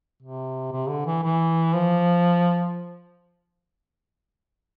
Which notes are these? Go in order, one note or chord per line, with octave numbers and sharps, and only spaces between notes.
C3
C3
D3
E3
E3
F3